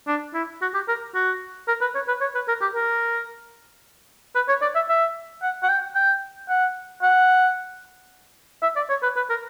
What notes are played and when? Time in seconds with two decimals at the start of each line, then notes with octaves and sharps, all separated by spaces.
0.07 D4
0.34 E4
0.62 F#4
0.74 G4
0.88 A#4
1.15 F#4
1.68 A#4
1.81 B4
1.95 C#5
2.08 B4
2.21 C#5
2.35 B4
2.48 A#4
2.61 G4
2.75 A#4
4.35 B4
4.49 C#5
4.62 D5
4.75 E5
4.89 E5
5.42 F#5
5.63 F#5
5.69 G5
5.95 G5
6.49 F#5
7.02 F#5
8.63 E5
8.76 D5
8.90 C#5
9.03 B4
9.16 B4
9.30 A#4